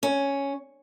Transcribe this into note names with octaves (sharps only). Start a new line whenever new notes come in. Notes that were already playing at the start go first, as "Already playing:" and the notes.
C#4